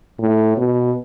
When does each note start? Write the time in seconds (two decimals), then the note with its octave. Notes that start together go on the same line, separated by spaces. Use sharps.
0.19 A2
0.57 B2